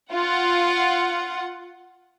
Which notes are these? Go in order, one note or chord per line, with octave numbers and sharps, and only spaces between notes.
F4 F#5